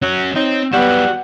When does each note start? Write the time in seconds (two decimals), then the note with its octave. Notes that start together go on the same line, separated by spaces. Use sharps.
0.02 F#3 C#4 F#4
0.36 C4 D#4 C#5
0.73 F#3 G3 B3 E4 F#5